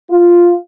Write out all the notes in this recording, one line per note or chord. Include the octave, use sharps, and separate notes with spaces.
F4